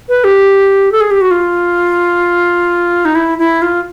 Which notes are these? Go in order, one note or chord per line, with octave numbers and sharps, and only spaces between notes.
B4
G4
A4
G#4
G4
F#4
F4
D#4
E4
E4
F4